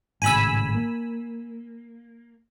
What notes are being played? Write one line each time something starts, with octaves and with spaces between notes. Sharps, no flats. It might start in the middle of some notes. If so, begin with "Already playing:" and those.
G#1 A2 C#3 G#5 B5 E6
A#3